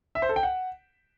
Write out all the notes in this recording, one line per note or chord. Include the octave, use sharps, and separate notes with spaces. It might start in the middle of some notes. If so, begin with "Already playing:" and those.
E5
C5
A4
G5
F#5